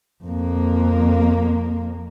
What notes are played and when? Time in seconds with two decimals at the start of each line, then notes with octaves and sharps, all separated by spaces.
0.24 F2 A#3